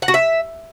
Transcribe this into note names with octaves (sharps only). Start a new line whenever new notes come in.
F#5
F#4
E5